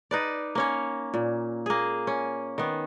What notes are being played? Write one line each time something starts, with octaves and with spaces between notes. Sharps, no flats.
D#4 B4 D5
A#3 C#4 C#5
A#2
A#3 G#4
C#4
D#3 B3